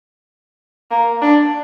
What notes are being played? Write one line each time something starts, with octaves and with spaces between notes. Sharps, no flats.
A#3
D4